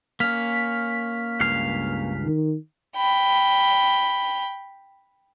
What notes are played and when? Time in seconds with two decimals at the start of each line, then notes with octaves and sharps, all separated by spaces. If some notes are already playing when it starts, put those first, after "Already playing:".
0.20 A#3 C#4 F6 B6
1.41 C#2 G2 F5
2.24 D#3
2.97 G5 B5